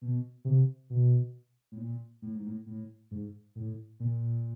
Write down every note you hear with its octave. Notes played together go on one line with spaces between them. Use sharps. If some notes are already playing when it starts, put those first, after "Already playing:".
B2
C3
B2
A2
A#2
A2
G#2
A2
A2
G#2
A2
A#2